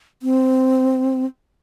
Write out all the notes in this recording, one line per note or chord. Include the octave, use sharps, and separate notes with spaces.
C4